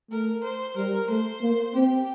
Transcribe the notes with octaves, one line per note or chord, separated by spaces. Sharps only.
A3 A#4
C5
G3 A#4
A3 C5
A#3
C4 G4